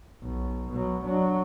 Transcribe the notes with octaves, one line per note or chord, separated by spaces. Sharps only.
B1
B2 F#3
F#3 D4